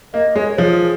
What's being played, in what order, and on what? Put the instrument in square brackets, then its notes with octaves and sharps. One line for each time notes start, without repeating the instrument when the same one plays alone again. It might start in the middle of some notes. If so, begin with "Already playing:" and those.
[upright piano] A#3 [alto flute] D#5
[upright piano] G#3 [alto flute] C#5
[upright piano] F3 [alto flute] G#4